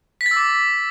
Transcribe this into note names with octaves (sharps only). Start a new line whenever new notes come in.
B6
A6
E6
D6